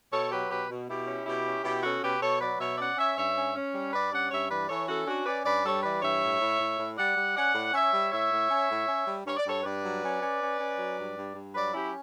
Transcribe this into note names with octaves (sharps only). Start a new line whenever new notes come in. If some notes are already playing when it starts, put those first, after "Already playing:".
B2 A4 C#5
F#3 G4 B4
B2 G4 B4
B2
B2 E4 G4
C#4
B2 E4 G4
C#4
B2 E4 G4
C#4 F#4 A4
B2 G4 B4
B2 A4 C#5
F#3 B4 D5
B2 C#5 E5
C#4 D5 F#5
C#4 C#5 E5
G2 C#5 E5
C#4
C#4
G3
G2 B4 D5
C#4 D5 F#5
G2 C#5 E5
E3 B4 D5
E3 A4 C#5
C#4 F#4 A4
C#4 D4 F#4
C#4 B4 D5
G2 B4 D5
G3 A4 C#5
E3 B4 D5
G2 C#5 E5
A2
A2
A2
A2
G3 D5 F#5
G3
C#4 D5 F#5
A2
C#4 C#5 E5
G3
A2 C#5 E5
A2
C#4
A2
C#4
G3
G2 C#5
D5
G2 A4 C#5
G2 B4 D5
F#3
C#4
C#4
C#4
C#4
F#3
G2
G2
G2
F#3 B4 D5
C#4 E4 G4